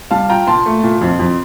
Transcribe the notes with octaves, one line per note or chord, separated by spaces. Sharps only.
G3 F5 A5
F4 G5 A#5
A#2 A5 C6
A3
A#2
F2
F2